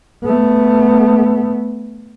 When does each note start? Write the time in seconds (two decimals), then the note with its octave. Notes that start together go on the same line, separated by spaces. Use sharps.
0.24 A3 B3